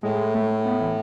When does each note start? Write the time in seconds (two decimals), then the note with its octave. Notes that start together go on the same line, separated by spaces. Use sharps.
0.03 A2 G#3
0.35 A3
0.66 B3
0.81 E3